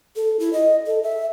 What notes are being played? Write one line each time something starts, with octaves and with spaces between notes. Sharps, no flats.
A4
E4
D#5
A4
E5